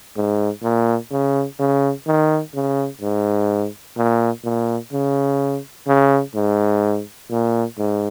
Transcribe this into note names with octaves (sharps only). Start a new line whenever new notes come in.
G#2
A#2
C#3
C#3
D#3
C#3
G#2
A#2
A#2
C#3
C#3
G#2
A#2
G#2